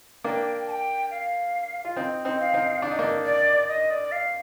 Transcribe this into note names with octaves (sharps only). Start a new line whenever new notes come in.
A#3 D4 G5
A5
G5
F5
F4
C4 D#4
C4 D#4
F5
C4 D#4
D4
D#4
A#3 D4
D5
D#5
D5
F5